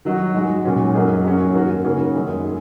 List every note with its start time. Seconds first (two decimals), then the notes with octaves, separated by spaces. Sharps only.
0.05 D#3 F#3 D#4 F#4
0.34 G#2 G#3 F#4
0.65 A#2 F#3 C#4
0.94 F#2 F#3 A#3 D#4 G#4
1.25 F#2 F#3 C#4 G#4
1.55 G#2 D#3 A#3 F#4
1.84 C#3 F#3 A#3 C#4 G#4
2.15 F#2 D#3 G#3
2.44 G#4